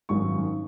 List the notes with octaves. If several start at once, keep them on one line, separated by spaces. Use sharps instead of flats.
G#1 F#2 D#3 F#3 C#6